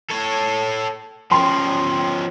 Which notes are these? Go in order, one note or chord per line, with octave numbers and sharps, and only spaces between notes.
A4 C#5
F3 C#4 G5 C6